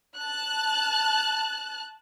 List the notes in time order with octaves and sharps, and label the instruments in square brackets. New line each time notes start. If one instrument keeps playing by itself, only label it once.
[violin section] A5 F#6